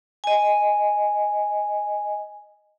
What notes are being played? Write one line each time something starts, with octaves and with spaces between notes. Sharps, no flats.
D#5 G#5